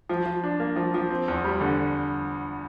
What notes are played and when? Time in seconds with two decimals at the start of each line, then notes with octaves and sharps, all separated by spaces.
0.09 F3
0.26 F3
0.43 D4
0.60 A#3
0.76 F3
0.94 F3
1.10 C4
1.28 E2
1.44 G3
1.61 D3